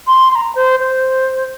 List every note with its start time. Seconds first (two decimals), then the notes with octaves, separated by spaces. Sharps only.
0.07 C6
0.32 C6
0.35 A#5
0.55 C5
0.80 C5